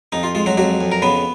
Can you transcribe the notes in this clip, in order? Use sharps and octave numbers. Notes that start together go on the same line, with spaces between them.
F2 D#4
F4
G#3 F4
F#3 F#4
F2 F#3 F#4
F2
A#4
C#3 B3 B4